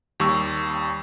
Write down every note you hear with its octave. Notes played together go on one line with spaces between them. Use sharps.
D#2 G3 C#6 E6